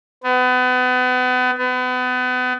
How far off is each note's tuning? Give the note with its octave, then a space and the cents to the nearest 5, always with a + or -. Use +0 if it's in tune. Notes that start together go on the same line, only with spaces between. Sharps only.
B3 +35
B3 +35